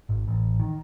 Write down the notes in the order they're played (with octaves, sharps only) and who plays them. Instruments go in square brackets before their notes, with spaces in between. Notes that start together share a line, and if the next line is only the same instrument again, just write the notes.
[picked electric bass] G#1
A1
D#3